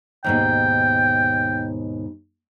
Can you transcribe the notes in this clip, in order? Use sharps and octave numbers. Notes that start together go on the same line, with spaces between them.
D#2 G#2 B2 G5